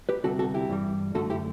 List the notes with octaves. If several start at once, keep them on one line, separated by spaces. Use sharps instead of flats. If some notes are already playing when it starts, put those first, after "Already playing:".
G4 B4
D2 C3 G3 F#4 A4
F#4 A4
E4 G4
G2 E3 G3
F#2 D3 A3 F#4 A4
E4 G4